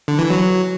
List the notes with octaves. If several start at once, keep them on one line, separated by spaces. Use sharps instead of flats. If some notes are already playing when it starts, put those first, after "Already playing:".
D3
E3
F#3